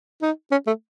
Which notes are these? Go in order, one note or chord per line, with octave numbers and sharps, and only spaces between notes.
D#4
C#4
A3